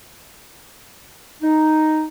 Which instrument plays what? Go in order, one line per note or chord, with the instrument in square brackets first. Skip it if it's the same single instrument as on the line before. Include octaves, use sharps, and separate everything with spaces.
[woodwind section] D#4